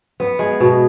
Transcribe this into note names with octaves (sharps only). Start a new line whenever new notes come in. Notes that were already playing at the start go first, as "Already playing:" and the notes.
B3
G#3
B2